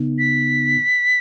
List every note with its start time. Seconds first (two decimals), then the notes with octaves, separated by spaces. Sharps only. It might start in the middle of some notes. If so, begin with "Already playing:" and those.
Already playing: C#3 B3 D#4
0.19 B6